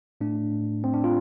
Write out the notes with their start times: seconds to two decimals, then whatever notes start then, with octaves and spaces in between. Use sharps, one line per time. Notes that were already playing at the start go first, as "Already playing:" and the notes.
0.21 A2 A3 D4
0.84 C4
0.94 D4
1.04 F4